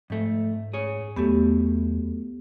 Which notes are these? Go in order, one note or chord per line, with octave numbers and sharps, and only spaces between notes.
F2 G#2 A3
G#4 C#5
E2 F#3 A3 B3 G4